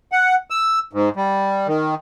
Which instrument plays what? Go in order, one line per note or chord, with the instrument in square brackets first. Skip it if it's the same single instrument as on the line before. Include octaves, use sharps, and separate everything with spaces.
[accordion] F#5
E6
G#2
G3
D#3